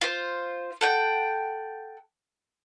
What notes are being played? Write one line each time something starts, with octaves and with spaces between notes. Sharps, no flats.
F4 C5
A4 F#5 G5